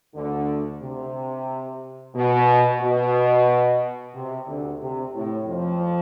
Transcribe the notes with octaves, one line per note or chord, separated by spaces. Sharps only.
D2 D3
C3
B2
B2
C3
D2 D3
C3
A2
F2 F3